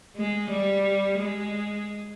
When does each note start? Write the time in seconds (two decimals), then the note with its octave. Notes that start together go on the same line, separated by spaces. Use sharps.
0.16 G#3
0.51 G3
1.20 G#3